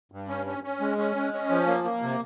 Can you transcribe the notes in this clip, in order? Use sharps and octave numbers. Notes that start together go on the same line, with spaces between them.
G2
C#4
C#4
C#4
G#3
C#4
G#3
C#4
F3
A#3
A#3
C3